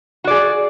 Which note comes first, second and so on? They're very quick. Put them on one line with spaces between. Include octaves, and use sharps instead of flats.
F#4 D5 G#4